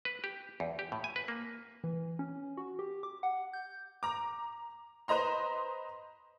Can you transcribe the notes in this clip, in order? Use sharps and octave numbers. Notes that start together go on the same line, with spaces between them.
B4
G4
E2
G4
A2
G#5
B4
A#3
E3
C#4
F#4
G4
D6
F#5
G6
A#5 D6
B4 C5 D#5 A#5 C6